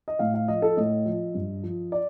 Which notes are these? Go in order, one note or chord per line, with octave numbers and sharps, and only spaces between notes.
D#5
A2 F5
F5
F3 D#5
A4
A2 D#5
F3
G2
F3
D5